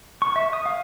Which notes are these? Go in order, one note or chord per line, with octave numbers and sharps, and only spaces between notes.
C#6
E5
D#6
F5